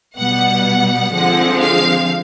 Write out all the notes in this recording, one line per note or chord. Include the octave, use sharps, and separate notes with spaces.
B2 G3 B3 F#5
D3 F3 G#3 C4 F#5
F5